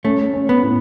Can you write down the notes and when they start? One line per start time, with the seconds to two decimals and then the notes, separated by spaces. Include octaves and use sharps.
0.04 A3 C#4
0.33 C#4
0.49 B3
0.63 A2